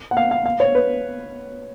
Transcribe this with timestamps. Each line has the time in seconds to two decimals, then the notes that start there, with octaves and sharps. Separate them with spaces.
0.11 F#5
0.17 F5
0.31 F5
0.46 F5
0.60 C#5
0.75 B4